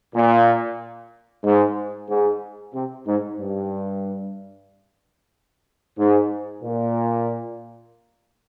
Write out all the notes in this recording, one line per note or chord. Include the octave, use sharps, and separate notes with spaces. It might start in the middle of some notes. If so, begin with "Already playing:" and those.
A#2
G#2
G#2
C3
G#2
G2
G#2
A#2